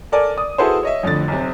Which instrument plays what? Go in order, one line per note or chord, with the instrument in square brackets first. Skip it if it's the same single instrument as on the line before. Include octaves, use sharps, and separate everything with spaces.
[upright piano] A4 A#4 D5 G#5
D5 D#6
E4 F#4 G#4 A4 B4 C5
C#5 D#5 E5
A1 F2 D3 A6
B1 C3